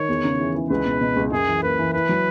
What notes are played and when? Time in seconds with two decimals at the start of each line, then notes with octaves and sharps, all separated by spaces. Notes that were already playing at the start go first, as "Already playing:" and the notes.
Already playing: D#3 C#5
0.09 E2
0.24 C#3
0.40 E3
0.55 E3
0.70 C#2 B4
0.85 B2
1.01 B2
1.17 C#2
1.31 F#2 G#4
1.47 E3
1.63 A#3 B4
1.79 E3
1.93 E4 B4
2.09 F#3